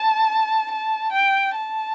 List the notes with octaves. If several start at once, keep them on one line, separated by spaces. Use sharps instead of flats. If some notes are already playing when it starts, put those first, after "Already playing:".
Already playing: A5
A5
G5
A5